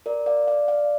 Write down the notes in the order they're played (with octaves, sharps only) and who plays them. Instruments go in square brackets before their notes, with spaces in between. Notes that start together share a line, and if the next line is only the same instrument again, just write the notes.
[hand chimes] A#4 D5
D5 F5
D5 F5
D5 F5